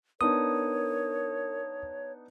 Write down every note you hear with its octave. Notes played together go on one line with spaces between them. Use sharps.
B3 D4 D#4 A#4 C#5 D#6